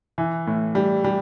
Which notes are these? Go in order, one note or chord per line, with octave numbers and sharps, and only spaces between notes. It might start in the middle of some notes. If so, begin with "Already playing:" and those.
E3
A2
G3
G3